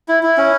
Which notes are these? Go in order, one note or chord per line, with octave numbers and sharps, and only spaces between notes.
E4
E4
C#4